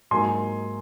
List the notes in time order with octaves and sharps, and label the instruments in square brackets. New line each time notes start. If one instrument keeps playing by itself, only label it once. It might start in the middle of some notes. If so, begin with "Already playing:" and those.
[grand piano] G#2 F#3 A#3 D#4 [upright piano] G#5 C6